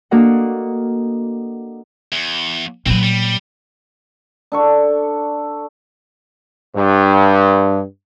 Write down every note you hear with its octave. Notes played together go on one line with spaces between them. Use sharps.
A#3 D4 F#4 A4 D#5 F#5
E2
A#2 F#3 C4 B4
G3
D4 A4 C#6
G2